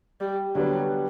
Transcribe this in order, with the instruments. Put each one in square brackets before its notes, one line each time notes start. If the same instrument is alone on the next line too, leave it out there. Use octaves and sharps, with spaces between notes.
[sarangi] G3
[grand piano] D3 G3 B3 [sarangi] F#3